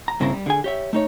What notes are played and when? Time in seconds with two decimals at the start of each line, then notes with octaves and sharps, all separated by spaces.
0.08 A#5
0.20 G2 C#3 A#3 C4 E4 A#5
0.33 G3
0.46 D3 G#4 G#5
0.64 G4 C#5 E5
0.93 A3 D#4 C#5